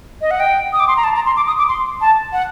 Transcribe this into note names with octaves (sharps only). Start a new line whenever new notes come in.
D#5
F#5
G5
D#6
D6
C6
A#5
A5
A#5
C6
D6
D#6
D6
C6
A5
F#5